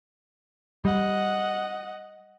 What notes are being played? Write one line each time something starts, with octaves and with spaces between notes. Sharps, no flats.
G3 D#5 F#5